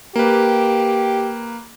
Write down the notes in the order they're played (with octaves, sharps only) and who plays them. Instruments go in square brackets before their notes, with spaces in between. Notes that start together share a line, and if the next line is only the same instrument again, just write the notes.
[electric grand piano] A#3 B4 [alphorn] G4